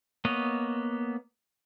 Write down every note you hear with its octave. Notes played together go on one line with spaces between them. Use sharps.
A#3 B3 C#5 D#5